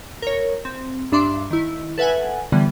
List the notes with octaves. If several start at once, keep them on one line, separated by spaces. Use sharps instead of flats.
A#4 C#5
C4
G2 D4 E5 C6 D6
D#3 E4
A4 B4 E5 F#5 G#5
D3 E3 G3 B3